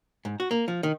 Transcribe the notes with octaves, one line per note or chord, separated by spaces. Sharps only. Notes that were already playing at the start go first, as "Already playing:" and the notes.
G#2
F#4
A#3
F3
D#3